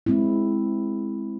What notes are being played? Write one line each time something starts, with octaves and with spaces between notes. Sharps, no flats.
G#3 C4 E4